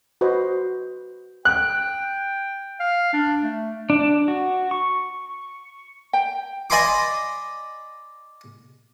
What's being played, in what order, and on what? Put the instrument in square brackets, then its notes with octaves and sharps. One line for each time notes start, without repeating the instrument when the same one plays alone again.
[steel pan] F#4 B4 C5 D#5
[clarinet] G5 [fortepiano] F#6
[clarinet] F5
D4
A3
[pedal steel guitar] D4
F#4
C#6
[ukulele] G5
[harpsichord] D5 D#5 G#5 B5 C6 D6